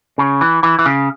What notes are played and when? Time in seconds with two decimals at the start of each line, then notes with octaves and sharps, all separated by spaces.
0.18 C#3
0.41 E3
0.63 E3
0.79 E3
0.86 C#3